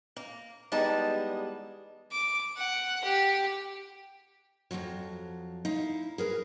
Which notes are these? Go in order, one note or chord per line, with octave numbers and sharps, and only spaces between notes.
A#3
E2 G3 G#3 B3 D#4 A5
D6
F#5
G4
F2 A2 F3 F#3
D#4 E4 F5
G#4 A#4 B4